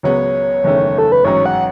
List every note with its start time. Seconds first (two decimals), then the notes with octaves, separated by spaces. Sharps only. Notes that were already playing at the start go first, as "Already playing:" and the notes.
0.03 C#2 C#3 F#3 B3 C#5
0.64 F#1 E2 D#3 A3 C#4
0.98 A4
1.12 B4
1.24 A1 G#2 F#3 C#4 C#5
1.46 F#5